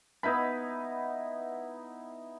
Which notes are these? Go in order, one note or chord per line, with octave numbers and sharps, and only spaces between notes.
B3 D#4 E4 B5